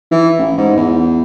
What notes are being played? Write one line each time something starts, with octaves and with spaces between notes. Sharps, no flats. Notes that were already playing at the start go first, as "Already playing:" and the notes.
E3
A1
G#2
E2